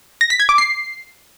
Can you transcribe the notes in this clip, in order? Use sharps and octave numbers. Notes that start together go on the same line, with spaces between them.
A#6
B6
G#6
D6
C7